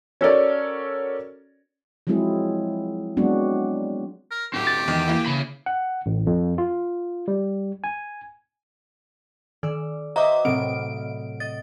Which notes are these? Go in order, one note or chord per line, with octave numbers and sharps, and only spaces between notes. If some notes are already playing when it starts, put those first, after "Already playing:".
C#4 F#4 A4 A#4 C#5 D5
F3 F#3 G#3 C4 E4 G#4
F#3 G#3 B3 C4 D4 F#4
A#4
F#3 C4 G4
A6
E2 D#3
E3 A#3
C#3 B5
F#5
A1
F2
F4
G3
G#5
D#3 D5 E6
F#4 B4 C5 D#5 E5 A#5 D6
A2 C3 F#3 C4 D7
D#5 A6